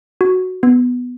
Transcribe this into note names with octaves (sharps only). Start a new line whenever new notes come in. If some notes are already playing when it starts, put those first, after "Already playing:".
F#4
B3